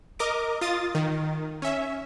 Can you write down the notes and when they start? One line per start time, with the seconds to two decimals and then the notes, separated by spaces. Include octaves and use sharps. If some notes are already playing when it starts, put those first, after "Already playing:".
0.19 A#4 D#5 D6
0.61 F4 D#6 A6
0.95 D#3
1.62 C#4 E5